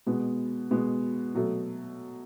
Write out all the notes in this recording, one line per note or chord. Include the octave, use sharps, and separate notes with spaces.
B2 G#3 B3
B2 G#3 B3
B2 F#3 A3